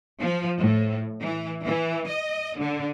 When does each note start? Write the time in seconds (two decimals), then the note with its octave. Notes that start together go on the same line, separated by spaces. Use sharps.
0.19 F3
0.58 A2
1.19 E3
1.64 E3
2.08 D#5
2.56 D3